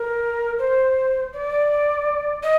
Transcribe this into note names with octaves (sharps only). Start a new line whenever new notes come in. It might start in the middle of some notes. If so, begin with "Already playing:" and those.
Already playing: A#4
C5
D5
D#5